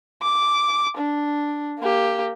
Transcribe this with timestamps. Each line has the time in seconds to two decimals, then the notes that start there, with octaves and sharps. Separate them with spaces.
0.22 D6
0.97 D4
1.80 A#3 G4